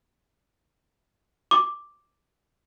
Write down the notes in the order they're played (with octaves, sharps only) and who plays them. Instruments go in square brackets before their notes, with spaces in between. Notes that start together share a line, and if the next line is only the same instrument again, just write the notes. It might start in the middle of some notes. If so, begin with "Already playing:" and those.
[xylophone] D6